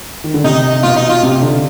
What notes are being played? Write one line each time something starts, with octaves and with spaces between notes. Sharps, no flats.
D#3
D3
C3 D#4
B2 F4
D#4
F4
C3
D3